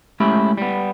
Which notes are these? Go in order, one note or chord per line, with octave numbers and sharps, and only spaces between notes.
G#3 A3 C#4 E4 G4
G3 B3